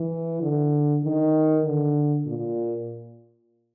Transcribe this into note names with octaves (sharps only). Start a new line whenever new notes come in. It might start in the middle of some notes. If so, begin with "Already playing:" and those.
Already playing: E3
D3
D#3
D3
A#2